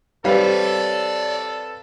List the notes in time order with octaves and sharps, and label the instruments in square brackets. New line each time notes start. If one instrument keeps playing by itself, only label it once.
[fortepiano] G3 [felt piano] C4 B4 F5 [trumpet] A4 [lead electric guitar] C#5 D5